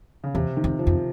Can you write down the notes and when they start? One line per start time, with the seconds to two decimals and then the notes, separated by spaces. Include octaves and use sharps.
0.24 C#3
0.35 E2 C3
0.57 D#3
0.64 F2
0.79 F3
0.87 F2